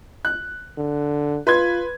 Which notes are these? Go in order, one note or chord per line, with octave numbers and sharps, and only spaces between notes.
F#6
D3
F4 B4 C6 G#6